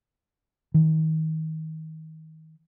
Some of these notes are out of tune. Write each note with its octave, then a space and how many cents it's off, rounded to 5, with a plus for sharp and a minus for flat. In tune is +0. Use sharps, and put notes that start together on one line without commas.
D#3 +30